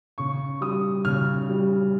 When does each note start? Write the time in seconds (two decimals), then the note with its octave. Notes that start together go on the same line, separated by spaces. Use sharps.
0.18 C#3 C#6
0.61 G3 D#6
1.05 C#3 F6
1.50 G3